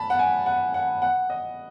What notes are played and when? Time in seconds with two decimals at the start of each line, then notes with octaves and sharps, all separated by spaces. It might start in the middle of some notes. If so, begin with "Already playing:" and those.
Already playing: A5 B5
0.10 F#5
0.19 G#5
0.46 F#5
0.74 F#5
1.02 F#5
1.30 D#5